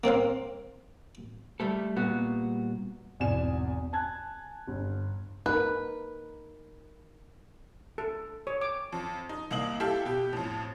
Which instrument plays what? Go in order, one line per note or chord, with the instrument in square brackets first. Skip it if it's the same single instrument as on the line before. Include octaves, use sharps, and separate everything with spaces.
[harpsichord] A#3 C4 C5 F5
[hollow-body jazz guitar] G3 A3 A4
A#2 G3 B3 F#4
[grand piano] G#1 E2 B2 D5 G#5 E7
G#5 A5 F#6 G#6
G1
[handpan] D#4 A#4 [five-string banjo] B4
[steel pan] A4
C#5
D6
[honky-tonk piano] F2
D#4
C2 A#3 D#5 F#7
E4 G4 A4 E5 F5 G5
B2 G4
F2 A2